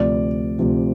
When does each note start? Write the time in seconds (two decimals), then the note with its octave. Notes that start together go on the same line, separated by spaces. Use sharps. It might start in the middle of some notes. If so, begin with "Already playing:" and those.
Already playing: D2 C3 F3 D5
0.59 D2 C3 F3